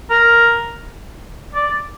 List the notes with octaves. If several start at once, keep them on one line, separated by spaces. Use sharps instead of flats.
A#4
D5